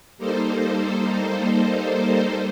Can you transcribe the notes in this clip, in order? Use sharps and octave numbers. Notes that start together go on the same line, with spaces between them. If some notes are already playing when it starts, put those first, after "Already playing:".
G3 A#3 D#4 A4 C5